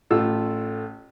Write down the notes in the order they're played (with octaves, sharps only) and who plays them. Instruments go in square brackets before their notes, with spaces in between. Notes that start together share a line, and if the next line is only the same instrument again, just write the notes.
[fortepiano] A1 A3 F4 E6